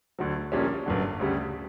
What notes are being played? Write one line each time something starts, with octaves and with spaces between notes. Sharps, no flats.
D2 D3 F#3
A#1 A#2 G3 C#4
G1 F#2 D3
D2 C#3 G3